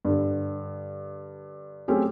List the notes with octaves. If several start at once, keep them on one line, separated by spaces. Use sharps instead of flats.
G2 D3
F#3 A3 C4 C#4 G4 G#4